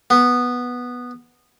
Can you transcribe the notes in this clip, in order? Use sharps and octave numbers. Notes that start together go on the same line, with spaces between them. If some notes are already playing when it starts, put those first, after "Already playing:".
B3